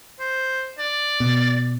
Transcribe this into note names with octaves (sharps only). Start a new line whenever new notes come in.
C5
D5
B2